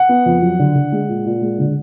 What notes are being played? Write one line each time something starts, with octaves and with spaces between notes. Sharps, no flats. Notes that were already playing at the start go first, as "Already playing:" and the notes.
Already playing: F#5
B3
F2
F#3
D3
D3
G#3
A#2
A#2
G#3
D3